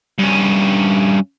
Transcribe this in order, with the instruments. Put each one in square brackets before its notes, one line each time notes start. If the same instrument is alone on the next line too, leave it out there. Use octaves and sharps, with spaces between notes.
[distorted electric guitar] G2 C#4